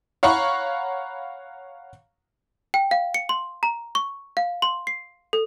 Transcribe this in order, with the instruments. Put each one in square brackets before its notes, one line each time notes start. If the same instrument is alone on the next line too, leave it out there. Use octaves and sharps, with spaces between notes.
[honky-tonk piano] C#5 F5 F#5 A#5 B5 C#6
[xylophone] G5
F5
C#7
C6
A#5
C#6
F5
C6
C7
A4